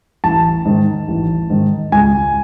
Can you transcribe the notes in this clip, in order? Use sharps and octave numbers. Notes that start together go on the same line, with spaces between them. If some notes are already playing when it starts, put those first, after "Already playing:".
A1 A5
G#2 D#3
A1
G#2 D#3
C#2 G#5